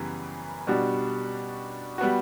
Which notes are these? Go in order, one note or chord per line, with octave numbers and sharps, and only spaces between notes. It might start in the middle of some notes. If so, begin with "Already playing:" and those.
Already playing: F#2 C#3 E3 G3 B3
B2 G3 D4 F#4
G3 B3 F#4